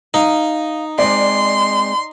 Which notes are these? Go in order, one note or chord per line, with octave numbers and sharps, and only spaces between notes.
D#4 F5
G#3 C4 D5 C6